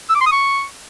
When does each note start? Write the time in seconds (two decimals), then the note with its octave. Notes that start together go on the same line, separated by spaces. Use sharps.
0.09 E6
0.15 D6
0.21 C6
0.26 D#6
0.32 C#6